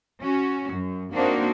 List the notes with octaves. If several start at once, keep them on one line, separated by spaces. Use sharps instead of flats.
C#4 F#4
F#2
A#3 C4 D4 D#4 F#4 C5